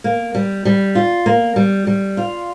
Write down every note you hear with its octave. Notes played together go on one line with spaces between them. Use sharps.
A#3
G3
G3
F4
A#3
G3
G3
F4